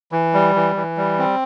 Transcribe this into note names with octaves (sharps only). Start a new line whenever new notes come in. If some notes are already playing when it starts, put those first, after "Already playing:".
E3
G3
E3
E3
G3
C4